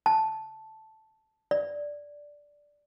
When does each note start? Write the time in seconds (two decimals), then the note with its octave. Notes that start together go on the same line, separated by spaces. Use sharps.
0.06 A5
1.51 D5